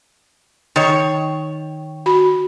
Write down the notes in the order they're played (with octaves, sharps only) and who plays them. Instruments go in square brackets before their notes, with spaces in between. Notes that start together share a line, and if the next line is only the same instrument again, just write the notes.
[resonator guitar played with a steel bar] D#3 C#5
[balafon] F#4 B5